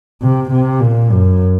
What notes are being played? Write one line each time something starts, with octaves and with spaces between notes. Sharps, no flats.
C3
C3
A#2
F#2